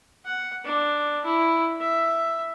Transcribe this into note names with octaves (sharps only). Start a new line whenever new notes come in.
F#5
D4
E4
E5